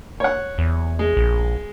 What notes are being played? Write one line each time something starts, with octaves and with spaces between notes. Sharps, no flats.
C#5 F#5
E2
G#3
A#1